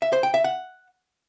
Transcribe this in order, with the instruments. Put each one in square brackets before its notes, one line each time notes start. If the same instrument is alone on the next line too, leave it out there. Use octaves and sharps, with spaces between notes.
[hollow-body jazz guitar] E5
C5
G5
E5
F#5